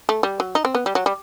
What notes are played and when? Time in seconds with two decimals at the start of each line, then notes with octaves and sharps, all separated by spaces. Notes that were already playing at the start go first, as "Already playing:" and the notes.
0.09 A3
0.23 G3
0.40 F#3
0.55 D#4
0.65 C4
0.75 B3
0.86 G3
0.95 F#3
1.06 G3